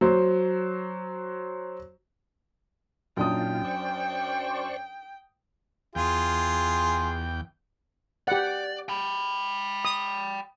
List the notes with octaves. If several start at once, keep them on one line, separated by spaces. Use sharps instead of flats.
F#3 C5
F#2 A#2 D4 D#4 F4 G5 D#6
C5 D5 C#6
E2 F4 G#4 G5
G4 D5 F#5
G5 B5
D#6